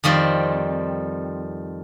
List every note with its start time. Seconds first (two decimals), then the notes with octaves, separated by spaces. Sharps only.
0.04 F2 D#3 G3 C4